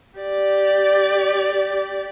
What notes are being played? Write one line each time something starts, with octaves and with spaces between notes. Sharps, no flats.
G4 D5